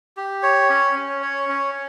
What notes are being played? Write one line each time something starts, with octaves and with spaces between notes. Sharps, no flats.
G4
C#5
C#4
C#4
C#5
C#4